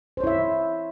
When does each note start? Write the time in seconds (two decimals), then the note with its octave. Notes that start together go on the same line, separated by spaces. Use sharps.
0.17 C5
0.20 C#5
0.24 E4
0.27 E5